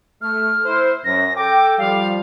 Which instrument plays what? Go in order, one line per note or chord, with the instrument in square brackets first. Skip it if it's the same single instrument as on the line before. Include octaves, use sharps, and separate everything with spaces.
[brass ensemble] A3 [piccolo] F6
[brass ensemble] E4 C5
[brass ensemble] F#2 [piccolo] A#6
[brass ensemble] A4 G5 [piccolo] D6
[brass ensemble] F3 G3 [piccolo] F5